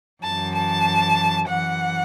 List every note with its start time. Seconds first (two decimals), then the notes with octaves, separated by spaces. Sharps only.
0.23 F#2 E3 A5
0.55 A5
1.48 F#2 E3 F#5